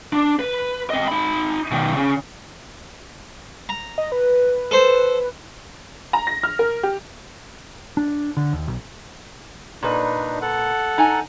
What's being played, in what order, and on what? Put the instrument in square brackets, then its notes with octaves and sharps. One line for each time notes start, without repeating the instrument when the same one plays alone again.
[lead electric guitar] D4
B4
C4 D#5
D#4 B5
B2 D#3
C#3
[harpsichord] A#5
[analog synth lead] D#5
B4
[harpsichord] A4 C5
[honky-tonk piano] A#5
A#6
F6
A#4
G4
[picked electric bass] D4
D3
D#2
B1
[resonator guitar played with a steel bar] A#2 B4 [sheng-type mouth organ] D4 D#4
[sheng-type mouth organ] A4 F#5
[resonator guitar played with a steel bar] D#4 G#5 A#5